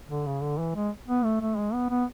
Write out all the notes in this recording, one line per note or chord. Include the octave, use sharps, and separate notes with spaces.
D3
C#3
D3
E3
G#3
B3
A3
A3
G#3
B3
B3